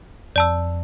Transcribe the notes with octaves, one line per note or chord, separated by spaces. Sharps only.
F2 D5 A5 E6